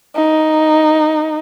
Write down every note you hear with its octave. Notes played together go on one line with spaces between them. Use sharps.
D#4